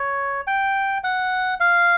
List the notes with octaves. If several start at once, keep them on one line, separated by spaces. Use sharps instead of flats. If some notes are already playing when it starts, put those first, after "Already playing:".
Already playing: C#5
G5
F#5
F5